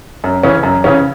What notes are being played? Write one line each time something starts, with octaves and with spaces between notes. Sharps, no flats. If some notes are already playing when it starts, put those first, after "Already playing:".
F#2
C#3 E3 C#4
F#2
C#3 E3 C#4